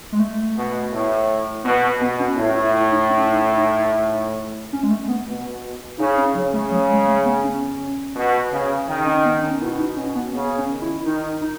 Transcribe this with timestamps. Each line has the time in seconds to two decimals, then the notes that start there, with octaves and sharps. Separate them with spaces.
0.12 G#3
0.19 A3
0.56 B2
0.92 A2
1.64 B2 B3
2.00 B2 B3
2.19 C#4
2.37 A2 E4
2.55 E4
2.73 E4
2.91 D#4
3.09 C#4
3.33 D#4
3.57 D#4
4.73 C#4
4.83 G#3
4.90 A3
5.08 B3
5.27 B2
5.98 C#3 D#4
6.17 C#4
6.34 C#3 F#3
6.53 A3
6.71 F#3
6.89 G#3
7.07 A3
7.25 B3
7.44 C#4
8.15 B2
8.52 C#3
8.89 D#3
9.06 C#4
9.25 B3
9.42 C#4
9.61 B2 E4
9.78 D#4
9.97 B2 C#4
10.15 B3
10.33 C#3 B3
10.58 C#4
10.70 D#3
10.81 E4
11.05 D#3 D#4
11.41 D#4